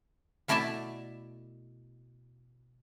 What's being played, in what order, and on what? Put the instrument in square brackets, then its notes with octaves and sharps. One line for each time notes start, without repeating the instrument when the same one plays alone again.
[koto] B2 A3 E4 D5 E5 A5